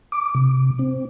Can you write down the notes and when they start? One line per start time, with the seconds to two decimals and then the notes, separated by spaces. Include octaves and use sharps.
0.12 D6
0.35 C3
0.79 C4